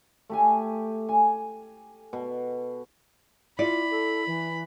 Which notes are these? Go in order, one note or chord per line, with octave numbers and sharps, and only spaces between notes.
A3 G4 G#5
G#5
B2
E4 F4 D5 B5
A4
E3